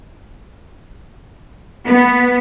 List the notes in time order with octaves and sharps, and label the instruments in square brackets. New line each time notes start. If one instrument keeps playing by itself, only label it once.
[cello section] B3